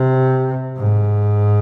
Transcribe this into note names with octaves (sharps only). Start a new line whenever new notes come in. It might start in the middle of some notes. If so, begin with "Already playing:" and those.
Already playing: C3
G#2